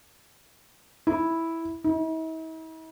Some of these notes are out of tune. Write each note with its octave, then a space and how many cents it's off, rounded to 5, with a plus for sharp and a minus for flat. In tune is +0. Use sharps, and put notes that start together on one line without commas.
E4 -5
E4 -45